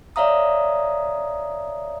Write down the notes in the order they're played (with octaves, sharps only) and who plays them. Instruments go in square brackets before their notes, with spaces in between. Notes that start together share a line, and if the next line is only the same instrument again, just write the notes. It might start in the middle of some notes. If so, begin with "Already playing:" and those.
[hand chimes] C#5 D5 E5 F5 A#5 D#6